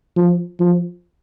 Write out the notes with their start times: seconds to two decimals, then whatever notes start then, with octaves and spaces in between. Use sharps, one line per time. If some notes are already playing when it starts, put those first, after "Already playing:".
0.16 F3
0.60 F3